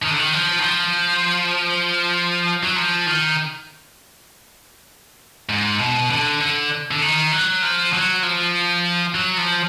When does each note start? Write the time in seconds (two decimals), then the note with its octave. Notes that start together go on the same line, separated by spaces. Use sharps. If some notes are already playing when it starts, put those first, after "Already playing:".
0.02 D#3
0.10 D3
0.19 D#3
0.33 F3
0.59 D#3
0.63 F3
2.63 F#3
2.76 F3
3.06 D#3
5.49 G#2
5.79 B2
6.10 D3
6.41 D3
6.91 D3
7.02 D#3
7.32 F#3
7.62 F3
7.93 F#3
8.23 F3
9.15 F#3
9.37 F3